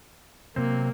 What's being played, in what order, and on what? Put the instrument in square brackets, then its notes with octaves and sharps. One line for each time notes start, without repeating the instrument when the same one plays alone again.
[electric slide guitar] C3 F#3 C4 [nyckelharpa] A#3